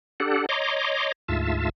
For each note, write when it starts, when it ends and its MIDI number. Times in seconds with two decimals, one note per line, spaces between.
0.20 0.46 62
0.20 0.46 67
0.20 0.46 69
0.20 0.46 78
0.49 1.12 73
0.49 1.12 75
0.49 1.12 82
0.49 1.12 84
0.49 1.12 86
1.28 1.69 38
1.28 1.69 44
1.28 1.69 65
1.28 1.69 76
1.28 1.69 81